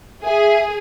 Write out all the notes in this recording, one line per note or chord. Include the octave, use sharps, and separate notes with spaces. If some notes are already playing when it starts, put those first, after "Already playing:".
G#4 E5